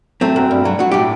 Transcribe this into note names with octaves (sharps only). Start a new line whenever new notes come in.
F#3 A3 C4
F#2
G2
F#3
F#3 F#4
A2 G4